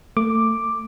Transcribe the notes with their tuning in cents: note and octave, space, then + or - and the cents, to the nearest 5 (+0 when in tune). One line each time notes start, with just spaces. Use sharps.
A3 +25 D6 +5